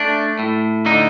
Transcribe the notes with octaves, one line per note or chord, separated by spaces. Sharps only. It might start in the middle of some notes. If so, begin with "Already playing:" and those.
Already playing: A3 D4
A2
D3 D#4